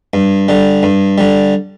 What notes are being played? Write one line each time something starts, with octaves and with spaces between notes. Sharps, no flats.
G2
D3 G3
G2
D3 G3